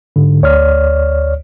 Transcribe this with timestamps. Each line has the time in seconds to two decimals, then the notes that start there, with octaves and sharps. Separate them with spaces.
0.16 G#2 D3
0.42 D2 C#5 D5 F6